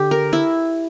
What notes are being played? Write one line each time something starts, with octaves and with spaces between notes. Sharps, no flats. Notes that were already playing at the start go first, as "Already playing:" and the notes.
Already playing: D3 G4
A#4
E4